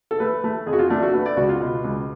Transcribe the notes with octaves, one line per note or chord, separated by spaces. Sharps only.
A4
A3 B4
A3
F2 G#4
F#4
F4
A3 D4
F#4
A3 B4
D5
C#2 F#4
F4
B2
C#2